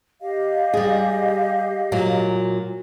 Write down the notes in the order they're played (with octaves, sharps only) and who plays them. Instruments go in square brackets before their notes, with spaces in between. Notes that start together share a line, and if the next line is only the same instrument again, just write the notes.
[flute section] G4 D#5 F5
[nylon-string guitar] G3 G#4
A#2 F#3